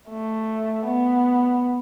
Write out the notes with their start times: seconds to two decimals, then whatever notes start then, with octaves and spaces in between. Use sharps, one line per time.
0.10 A3
0.86 B3